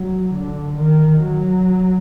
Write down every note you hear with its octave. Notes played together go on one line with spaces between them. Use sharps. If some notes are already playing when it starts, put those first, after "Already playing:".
Already playing: F#3
D3
D#3
F#3